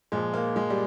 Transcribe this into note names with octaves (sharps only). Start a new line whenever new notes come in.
A#2 F3 G#3
A#3
G#3
G3